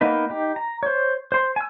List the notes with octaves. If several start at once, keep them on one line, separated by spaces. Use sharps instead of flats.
A#3 B3 D#4 B4
D#4 G4
A#5
C5 C#5
C5 C6
G#5 E6